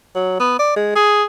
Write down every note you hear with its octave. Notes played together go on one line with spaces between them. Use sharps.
F#3
B3
D5
G#3
G#4